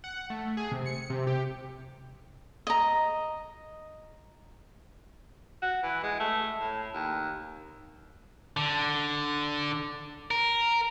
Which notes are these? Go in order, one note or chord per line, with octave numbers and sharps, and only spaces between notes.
F#5
A3
G#4
C3
C#7
C3
G4
D#5 A#5
F#4
E3
G#3
A3
A2
D#2
D3
A#4